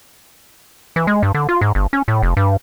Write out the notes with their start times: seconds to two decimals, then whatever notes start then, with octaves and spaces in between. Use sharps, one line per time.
0.96 E3
1.07 G#3
1.23 G2
1.34 D3
1.49 F4
1.61 G#2
1.75 G1
1.93 C#4
2.08 A2
2.23 F1
2.37 G2